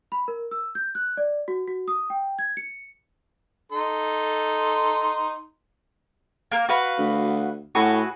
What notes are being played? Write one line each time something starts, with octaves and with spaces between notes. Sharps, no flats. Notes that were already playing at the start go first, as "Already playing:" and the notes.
B5
A#4
E6
G6
F#6
D5
F#4
F#4
D#6
G5
G#6
C#7
D#4 A4 C6
A#3 A#4
F#4 B4 F5
D2
A2 F#4 G#4 B4